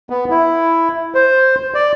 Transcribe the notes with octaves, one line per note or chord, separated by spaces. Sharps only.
B3
E4
C5
D5